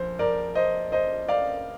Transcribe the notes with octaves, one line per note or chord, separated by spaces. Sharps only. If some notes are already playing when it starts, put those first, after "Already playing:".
Already playing: A#1 C5
A#4 D5
C5 D#5
C5 D#5
D5 F5